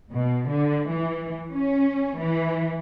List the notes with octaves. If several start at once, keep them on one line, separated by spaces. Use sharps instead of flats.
B2
D3
E3
C#4
E3